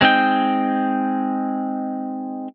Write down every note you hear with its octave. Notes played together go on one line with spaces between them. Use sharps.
G#3 C4 D#4 G5